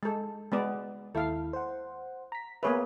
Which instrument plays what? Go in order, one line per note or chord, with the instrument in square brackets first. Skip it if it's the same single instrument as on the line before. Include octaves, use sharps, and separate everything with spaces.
[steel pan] G#3 A4
G#3 B3 D5
[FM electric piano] D#2 E4 [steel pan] A4 F5
[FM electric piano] C5 F#5
A#5 B6
[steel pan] A#3 G#4 B4 [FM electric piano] B3 C#5 E5